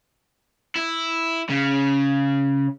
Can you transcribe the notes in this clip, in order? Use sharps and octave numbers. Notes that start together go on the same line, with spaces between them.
E4
C#3